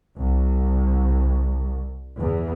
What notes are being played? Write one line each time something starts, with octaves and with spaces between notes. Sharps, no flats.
C2
E2